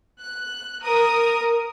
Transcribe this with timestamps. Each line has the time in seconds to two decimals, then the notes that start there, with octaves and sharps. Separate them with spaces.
0.19 F#6
0.81 A#4 D#6